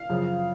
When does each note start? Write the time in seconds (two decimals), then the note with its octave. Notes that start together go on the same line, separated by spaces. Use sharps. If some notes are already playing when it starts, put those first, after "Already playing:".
Already playing: F5
0.10 F#2 C#3 F3